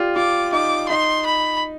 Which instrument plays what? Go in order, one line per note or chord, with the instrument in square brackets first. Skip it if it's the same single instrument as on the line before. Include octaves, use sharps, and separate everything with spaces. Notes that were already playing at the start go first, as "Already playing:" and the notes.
Already playing: [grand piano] F4 G4 D5
[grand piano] F4 [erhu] D6
[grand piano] D#4 [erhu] D6
[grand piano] D#4 [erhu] C6
[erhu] B5